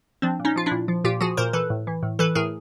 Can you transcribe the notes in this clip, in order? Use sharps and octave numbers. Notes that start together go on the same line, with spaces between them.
F3 C4 D4
A#2
C#4 D#4
F3 F4
D4 E4
A#2
F3
A#2 F4 G4
F3 F#4 G#4
A#2 A#4 C5
E3 A4 B4
A2
E3
A2
E3 A4 B4
A2 G#4 A#4